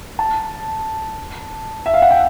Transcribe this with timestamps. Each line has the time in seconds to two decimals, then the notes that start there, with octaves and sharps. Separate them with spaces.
0.19 A5
1.86 E5
1.94 F5
2.02 F#5
2.11 G5